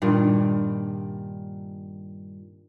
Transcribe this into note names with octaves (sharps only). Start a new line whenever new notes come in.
G2 A#2 D#3